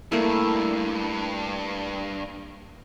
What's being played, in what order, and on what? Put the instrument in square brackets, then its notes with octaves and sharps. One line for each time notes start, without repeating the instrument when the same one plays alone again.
[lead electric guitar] G2 [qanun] A3 A#3 E4